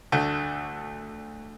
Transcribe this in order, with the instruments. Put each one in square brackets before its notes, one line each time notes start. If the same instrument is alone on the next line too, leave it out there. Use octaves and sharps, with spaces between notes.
[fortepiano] D2 D3 A3